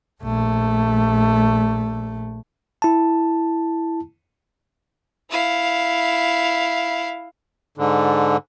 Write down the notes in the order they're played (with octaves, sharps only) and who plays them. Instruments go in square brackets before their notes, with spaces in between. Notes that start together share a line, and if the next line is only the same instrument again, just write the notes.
[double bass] A#1 A3
[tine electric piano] E4 A5
[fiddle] E4 F5
[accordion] G#2 D3